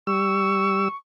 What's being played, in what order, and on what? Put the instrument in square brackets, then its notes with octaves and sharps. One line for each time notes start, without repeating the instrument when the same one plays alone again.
[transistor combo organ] G3 E6 [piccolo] C#6